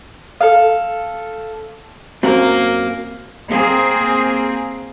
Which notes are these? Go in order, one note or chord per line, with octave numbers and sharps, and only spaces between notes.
A4 F5
F#2 F#3 A#3 C4
A#3 C4 G#4